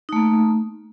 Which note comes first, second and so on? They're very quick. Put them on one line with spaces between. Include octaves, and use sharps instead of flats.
D#4 A3 A#3